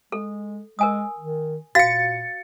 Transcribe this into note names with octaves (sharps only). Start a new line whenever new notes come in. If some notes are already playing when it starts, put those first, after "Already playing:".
G#3 A4
G#3 A#4 G#5 D#6
D#3
A#2 F#4 F5 A6 C#7